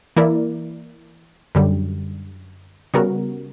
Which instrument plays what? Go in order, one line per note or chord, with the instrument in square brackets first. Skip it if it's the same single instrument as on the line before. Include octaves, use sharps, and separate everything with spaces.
[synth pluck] E3 A#3 E4 A#4 D5
F#2 D3 G3
C#3 G3 B3 F#4 A#4